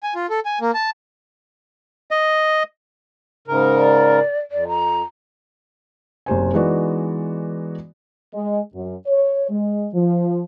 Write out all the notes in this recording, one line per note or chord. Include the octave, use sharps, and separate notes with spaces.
G#5
F4
A4
G#5
A#3
A5
D#5
G#2 C#3 A#4
D5
F2 D5
A#5
F#1 C3 C5 G#5
E3 G#3 B3 D#4 F#4 D5
G#3
F#2
C#5
G#3
F3